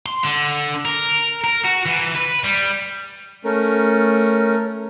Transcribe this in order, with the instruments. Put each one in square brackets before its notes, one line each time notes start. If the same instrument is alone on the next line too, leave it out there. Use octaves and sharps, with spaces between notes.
[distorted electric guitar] C6
D3
A#4
A#4
F#4
E3
B4
G3
[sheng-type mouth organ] A3 C#4 A#4